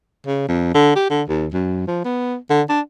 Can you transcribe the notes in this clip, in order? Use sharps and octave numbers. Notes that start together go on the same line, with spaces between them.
C#3
F2
D3
G4
D3
D#2
F#2
F3
B3
D3
D4